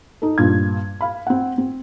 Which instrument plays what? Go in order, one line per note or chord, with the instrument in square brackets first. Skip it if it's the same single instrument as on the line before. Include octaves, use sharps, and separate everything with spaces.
[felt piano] D#4 A4
G2 A#2 G#6
F5 B5
C4 F#5
C4